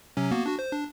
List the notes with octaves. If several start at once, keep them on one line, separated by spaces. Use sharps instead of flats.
C3 F#3 C#4
A#3 B3 F#4
D4 F#4
C5
D4